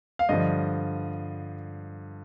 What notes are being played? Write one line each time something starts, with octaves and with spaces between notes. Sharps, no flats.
F5
G2 D3 F3 D#5